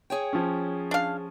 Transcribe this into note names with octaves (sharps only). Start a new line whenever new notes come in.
G#4 C#5 G5
F3 C#4
D4 F5